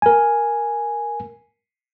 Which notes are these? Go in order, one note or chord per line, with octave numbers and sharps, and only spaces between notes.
A#4 G#5